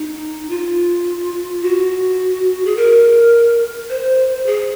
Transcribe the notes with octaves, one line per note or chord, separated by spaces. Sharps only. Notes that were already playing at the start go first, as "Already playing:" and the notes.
Already playing: D#4
F4
F#4
G#4
A#4
C5
G#4